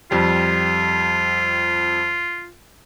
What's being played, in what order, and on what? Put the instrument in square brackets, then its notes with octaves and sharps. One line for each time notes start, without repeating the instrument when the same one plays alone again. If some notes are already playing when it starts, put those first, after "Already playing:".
[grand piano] F2 G3 [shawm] F4